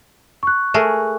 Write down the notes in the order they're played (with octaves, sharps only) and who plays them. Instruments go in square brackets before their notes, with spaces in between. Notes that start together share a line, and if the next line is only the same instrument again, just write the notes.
[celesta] C#6 F#6
[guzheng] A3 G#4 A#4